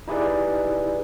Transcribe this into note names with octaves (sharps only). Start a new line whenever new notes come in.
D#4 E4 G4 G#4 B4 D5